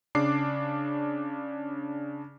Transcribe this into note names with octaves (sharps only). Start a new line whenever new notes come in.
C#3 D4 D6 C7